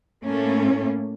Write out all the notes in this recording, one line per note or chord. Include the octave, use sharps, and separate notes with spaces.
A2 A3 A#3 C#4